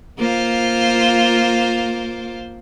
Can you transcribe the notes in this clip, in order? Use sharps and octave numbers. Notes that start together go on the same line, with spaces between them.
A#3 F4 C5